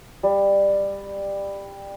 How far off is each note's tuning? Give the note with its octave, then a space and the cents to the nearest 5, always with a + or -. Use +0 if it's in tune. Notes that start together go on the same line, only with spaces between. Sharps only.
G3 +15